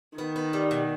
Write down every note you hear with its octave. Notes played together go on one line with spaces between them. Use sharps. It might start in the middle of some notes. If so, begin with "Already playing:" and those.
D#3 B3
B3
G3
B2